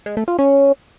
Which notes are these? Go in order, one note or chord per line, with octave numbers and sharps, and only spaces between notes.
G#3
A3
F4
C#4